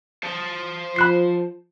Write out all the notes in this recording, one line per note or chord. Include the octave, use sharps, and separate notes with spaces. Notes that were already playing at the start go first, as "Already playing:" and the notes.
C5 A5
F3 B5 F#6 C7